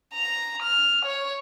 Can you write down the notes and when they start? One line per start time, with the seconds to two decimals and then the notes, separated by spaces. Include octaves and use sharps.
0.14 A#5
0.62 F6
1.05 C#5